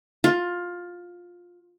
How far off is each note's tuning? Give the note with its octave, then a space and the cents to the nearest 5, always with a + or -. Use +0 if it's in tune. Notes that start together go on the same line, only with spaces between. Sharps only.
F4 +15